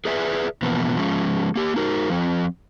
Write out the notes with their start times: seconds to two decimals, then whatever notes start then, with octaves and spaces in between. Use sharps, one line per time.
0.05 G#4 B4 D5 E5
0.62 B2 E3 F3 A#3 B3
0.96 F3 G#3 C#4
1.56 A#3 G4
1.76 D#4 F#4 A#4
2.10 F3 C4